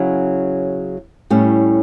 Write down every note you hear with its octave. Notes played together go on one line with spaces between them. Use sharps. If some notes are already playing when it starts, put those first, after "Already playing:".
Already playing: C#3 F#3 C#4 E4
A2 G3 C#4